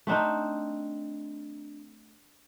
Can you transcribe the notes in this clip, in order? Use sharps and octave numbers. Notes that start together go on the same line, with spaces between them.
A3 C4 D4 D#4